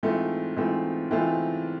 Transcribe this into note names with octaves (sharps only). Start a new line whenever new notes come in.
G#2 E3 A3 C4 F4
G#2 E3 A3 C4 F4
G#2 E3 A3 C4 F4